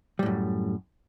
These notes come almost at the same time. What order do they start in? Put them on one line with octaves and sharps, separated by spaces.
G3 A2 F#2